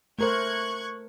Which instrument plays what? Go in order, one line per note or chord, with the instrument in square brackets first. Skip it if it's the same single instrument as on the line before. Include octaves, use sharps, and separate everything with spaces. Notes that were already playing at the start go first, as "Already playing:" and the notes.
[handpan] A3 A#4 C5 [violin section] C#6 F#6 G#6